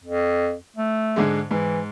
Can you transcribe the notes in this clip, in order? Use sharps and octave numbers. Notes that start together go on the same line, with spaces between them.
F2
A3
G#2 D3 G#3
G#2 E3